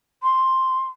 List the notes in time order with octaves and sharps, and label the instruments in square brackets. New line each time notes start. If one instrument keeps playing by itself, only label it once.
[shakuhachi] C6